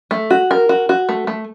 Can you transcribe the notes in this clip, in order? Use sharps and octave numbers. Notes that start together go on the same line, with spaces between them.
A3
F#4
A#4
F#4
F#4
A3
A3